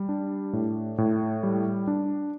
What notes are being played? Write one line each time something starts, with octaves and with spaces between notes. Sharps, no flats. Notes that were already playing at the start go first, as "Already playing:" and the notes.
Already playing: G3
D4
A2
A2
G3
D4